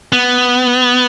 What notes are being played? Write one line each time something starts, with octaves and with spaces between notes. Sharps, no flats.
B3